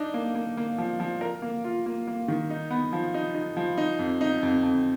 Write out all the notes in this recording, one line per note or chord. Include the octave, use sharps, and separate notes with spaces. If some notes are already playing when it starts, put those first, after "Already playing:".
Already playing: D4 D#4
A#3
A#3
A#3
F3
F3
A#4
A#3
F4
A#3
A#3
D#3
D#4
B3
F3
D#4
D#4
F3
D#4
F2
D#4
F2
F2